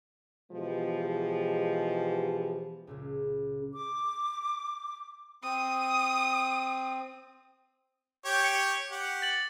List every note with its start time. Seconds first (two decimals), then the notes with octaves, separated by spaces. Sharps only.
0.52 B2 E3 F3 G#3 G4 G#4
2.87 C#2 A#2 C#3
3.72 D6
5.43 C4 D#6
8.25 G4 C#5 G5
8.44 C#7
8.91 G4 F#5
9.22 A6 F#7